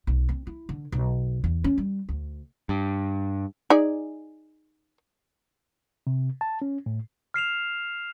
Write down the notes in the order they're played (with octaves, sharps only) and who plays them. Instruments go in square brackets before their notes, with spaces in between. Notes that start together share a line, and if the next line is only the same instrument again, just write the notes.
[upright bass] B1
C4
E4
D3
B1
E2
C#4
G3
D2
[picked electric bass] G2
[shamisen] D#4 G#4 D5
[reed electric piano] C3
A5
C#4
A2
[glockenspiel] F6 C7 E7 F7